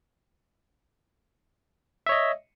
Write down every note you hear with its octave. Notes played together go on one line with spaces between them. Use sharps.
C#5 D#5 E5